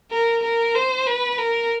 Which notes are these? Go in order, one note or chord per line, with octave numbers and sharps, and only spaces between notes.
A#4
A#4
C5
B4
A#4